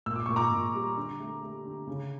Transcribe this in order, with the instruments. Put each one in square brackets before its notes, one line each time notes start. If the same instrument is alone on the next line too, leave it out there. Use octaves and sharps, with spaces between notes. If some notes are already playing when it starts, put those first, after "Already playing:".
[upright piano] A#2 E6
D6
A#2 C#6
A#5 D6
A#2
G3
D3
A3
A3
D3
C#3